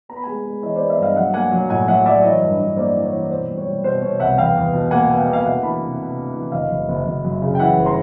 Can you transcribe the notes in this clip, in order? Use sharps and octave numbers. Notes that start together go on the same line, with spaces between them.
B3 A#5
B5
G#3 G#5 A#5
G#3
E3 C#5 D#5
B3 C5 D5
D5 E5
G2 D#5 F5
F#3 E5 F#5
A#3 F#5 G#5
F#3
A2 F#5 G#5
F#3 E5 F#5
F#3 D5 E5
E3 C#5 D#5
G2
G2
A#3 C5 D5
E3
C#5
E3
B2 C5
G3
C#5
G3
B2 C5
B2 C#5
C2 E5 F#5
E2 F5 G5
E2
B2
A#3 F#5 G#5
B2
F5 G5
A#3
F5
D2 E5 F#5
E3 A5 B5
C3
C3
D2
E3
F#1 D#5 F5
F#1
F#1
F#1
F#2
C#3
G5
E3 E5 F#5
G1
A#5 C6